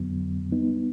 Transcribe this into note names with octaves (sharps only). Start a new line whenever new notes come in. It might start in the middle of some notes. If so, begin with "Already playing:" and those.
Already playing: F2 D3 F#3 B3
G3 B3 D#4